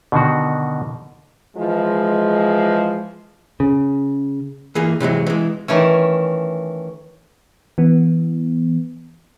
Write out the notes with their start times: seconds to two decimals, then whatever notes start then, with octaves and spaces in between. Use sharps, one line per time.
0.12 B2 D3 D#3 F#4
1.57 E3 F3 G#3
3.60 C#3
4.75 E3 A#3 G#4
5.00 C3 E3 F#3 G#3
5.27 E3 G#3
5.68 D#3 E3 A3 C#4
7.78 E3 B3